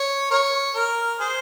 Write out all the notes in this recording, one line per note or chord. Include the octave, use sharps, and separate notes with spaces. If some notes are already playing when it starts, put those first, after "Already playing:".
Already playing: C#5
A#4 C#5
A#4
G#4 C5